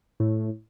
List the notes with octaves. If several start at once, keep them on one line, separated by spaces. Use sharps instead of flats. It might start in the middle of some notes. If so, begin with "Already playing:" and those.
A2